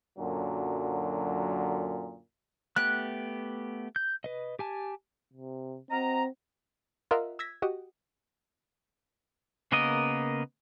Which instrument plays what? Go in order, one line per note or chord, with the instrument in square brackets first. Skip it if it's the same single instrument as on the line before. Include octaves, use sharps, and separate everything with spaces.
[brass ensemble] F#2 A#2 D3 F#3
[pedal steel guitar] A3 B3 G4 [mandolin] F#6
[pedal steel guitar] G6
B4 D#5
G4 G#5 A5
[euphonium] C3
[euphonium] C4 [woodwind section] F#4 D#5 A#5
[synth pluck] F4 A#4 D#5 E5 F#5
E6 G#6 A#6 B6
F#4 G4 D#5
[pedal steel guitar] C#3 A#3 B3 A#4 D#5